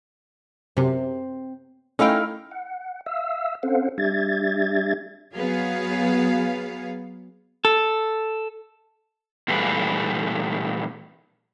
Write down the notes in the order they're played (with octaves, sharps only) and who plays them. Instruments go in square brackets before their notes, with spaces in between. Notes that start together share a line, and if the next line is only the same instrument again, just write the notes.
[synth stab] F#2 C3 [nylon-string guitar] C4
[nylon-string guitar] A3 D#4 F5 [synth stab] C#4 G5 [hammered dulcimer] E4 A#4 D#5
[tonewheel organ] F#5
E5 F5 E6
C4 C#4 A4 C5 F5 F#5
G3 D4 G4 E5 G#6 A6
[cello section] F#3 B3 G#4 F5
[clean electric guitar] A4
[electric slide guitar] A#2 E3 G3 A3 G#4 B4